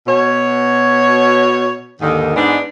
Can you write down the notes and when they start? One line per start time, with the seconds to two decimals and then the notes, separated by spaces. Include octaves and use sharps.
0.07 B2 C#5
2.01 D#2 G#2 D3 D#3
2.36 G#2 G#3 B3 D4